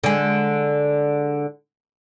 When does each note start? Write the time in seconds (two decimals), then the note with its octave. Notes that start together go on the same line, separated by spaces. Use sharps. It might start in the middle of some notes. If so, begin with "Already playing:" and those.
0.04 D3 G#3